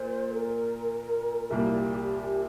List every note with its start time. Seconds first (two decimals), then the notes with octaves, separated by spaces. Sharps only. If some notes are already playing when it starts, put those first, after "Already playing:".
Already playing: A#2 C5
0.31 A4
0.36 A#4
1.50 C2 A#2 G3 A#3 G4